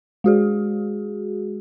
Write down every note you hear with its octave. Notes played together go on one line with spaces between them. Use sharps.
G#3 F#4 G#4